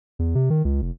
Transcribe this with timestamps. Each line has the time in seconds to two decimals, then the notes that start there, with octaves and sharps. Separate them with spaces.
0.19 E2
0.35 C3
0.50 D#3
0.65 C#2
0.82 F1